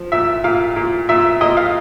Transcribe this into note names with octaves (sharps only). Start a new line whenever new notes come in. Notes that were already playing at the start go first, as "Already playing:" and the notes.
Already playing: F3
A#2 E5
A#2 F5
A#2
A#2 E5
A#2 D#5
F5